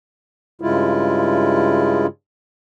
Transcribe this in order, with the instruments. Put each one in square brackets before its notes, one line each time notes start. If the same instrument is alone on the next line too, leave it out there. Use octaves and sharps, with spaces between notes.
[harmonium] G2 C#3 G#3 E4 F4